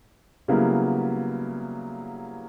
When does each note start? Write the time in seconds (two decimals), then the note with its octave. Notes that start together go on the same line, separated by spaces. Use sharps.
0.48 C#3 F#3 G3 A#3 B3 E4